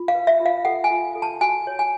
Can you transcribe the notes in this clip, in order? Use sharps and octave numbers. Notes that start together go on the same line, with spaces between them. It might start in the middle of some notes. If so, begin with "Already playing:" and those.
Already playing: F4
F5
B4
E5
F4
F5
A4 F#5
G#5
F4
A4
A5
F#4 G#5
C#5
G#5